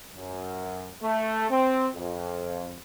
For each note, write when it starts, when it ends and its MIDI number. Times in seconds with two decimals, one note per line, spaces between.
0.15 0.91 42
1.03 1.45 57
1.50 1.87 60
1.95 2.75 41